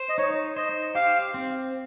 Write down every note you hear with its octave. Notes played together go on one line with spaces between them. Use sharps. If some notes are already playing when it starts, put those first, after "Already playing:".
Already playing: C5
D#5
D#4 C#5
C5 D#5
G4 F5
C4